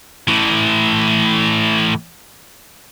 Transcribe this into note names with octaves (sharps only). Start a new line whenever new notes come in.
A2 E3